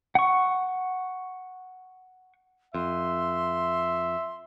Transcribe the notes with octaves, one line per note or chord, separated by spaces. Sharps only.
F#5 C#6
F2 E5 C6